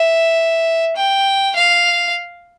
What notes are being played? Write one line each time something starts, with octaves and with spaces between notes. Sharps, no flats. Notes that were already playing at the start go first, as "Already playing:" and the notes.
Already playing: E5
G5
F5